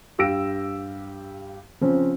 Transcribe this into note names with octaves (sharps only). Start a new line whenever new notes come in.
G2 G4 F5 E6 A#6 D7
C#3 F3 C4 C#4